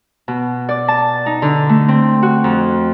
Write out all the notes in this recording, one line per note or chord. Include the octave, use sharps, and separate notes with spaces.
B2
D5
A5
D#4
D3
A3
C4
F#4
F2